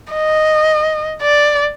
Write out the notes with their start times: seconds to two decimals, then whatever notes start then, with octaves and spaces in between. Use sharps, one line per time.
0.13 D#5
1.22 D5